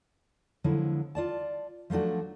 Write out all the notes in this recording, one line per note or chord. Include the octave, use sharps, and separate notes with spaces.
D3 F3 F#3 G#3 B3 E4
F4 D5 A5
F3 F#3 A3 D4 F#4